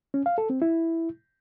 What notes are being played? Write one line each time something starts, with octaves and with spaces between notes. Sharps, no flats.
C#4
F5
A4
C4
E4